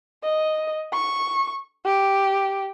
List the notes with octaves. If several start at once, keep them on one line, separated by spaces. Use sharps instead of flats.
D#5
C#6
G4